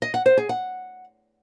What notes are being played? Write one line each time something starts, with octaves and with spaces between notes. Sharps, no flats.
D#5
F#5
C5
G#4
F#5